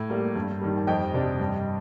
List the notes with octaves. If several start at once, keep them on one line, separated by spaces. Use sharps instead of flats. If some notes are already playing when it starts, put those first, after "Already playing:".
Already playing: A2
G3 A#3
G2
D#3 G3
A5
F2 D#5 G5
C3 G3 D4
G2